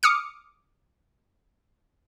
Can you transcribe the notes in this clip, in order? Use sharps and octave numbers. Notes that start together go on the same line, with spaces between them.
D6 D#6 F6 C#7